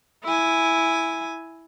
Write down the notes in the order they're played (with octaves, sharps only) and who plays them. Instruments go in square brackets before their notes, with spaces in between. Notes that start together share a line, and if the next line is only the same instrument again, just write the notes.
[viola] E4 G#5